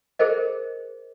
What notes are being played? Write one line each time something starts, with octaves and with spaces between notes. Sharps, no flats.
G#4 A#4 C5 D#5